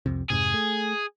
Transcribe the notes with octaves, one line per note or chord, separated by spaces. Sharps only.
C2 F2 C3
F2 G#2 C3 G#4
A3